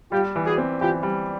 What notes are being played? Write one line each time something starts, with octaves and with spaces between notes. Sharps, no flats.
G3 F4 G4
E3
F#4 G#4
C4
E3 F4 G4
G3